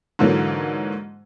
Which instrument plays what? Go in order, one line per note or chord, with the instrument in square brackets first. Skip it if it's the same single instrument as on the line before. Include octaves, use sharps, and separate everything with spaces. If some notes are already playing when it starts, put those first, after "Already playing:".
[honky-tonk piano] G#2 D3 E3 F#3 A#3